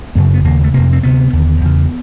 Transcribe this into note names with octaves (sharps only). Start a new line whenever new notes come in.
F#2 C#3 B3
B3
D#2 C#3 A#3
A3
F2 C3 A#3
C4
D2 C3 B3
D#2 D3
E2 C#3